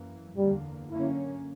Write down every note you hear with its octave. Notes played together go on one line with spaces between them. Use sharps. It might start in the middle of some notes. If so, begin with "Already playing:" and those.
Already playing: F#2 E3 A#3
E2 D3 G3 A#3
F#2 D3 A#3 C#4 E4